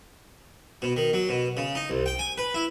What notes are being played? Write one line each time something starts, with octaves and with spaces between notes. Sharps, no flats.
B2
D#3
F#3
B2
C#3
D#4
C2
G5
G#5
B4
E4